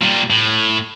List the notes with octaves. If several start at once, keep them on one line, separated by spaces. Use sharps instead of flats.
A#2 G3
A2